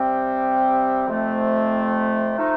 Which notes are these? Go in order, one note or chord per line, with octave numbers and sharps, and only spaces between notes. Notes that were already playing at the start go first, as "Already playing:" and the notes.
Already playing: C3 G3 C4
F2 C3 F3 A3 C4
F3 A3 D#4